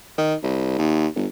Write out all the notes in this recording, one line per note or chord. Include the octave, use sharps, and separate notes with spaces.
D#3
C2
D#2
G1